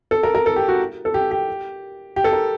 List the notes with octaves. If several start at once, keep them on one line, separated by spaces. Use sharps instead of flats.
A4
A#4
A#4
A4
G4
F#4
A4
G4
G4
G4
A4
A#4